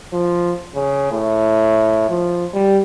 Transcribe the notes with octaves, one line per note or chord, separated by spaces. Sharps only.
F3
C#3
A2
F3
G3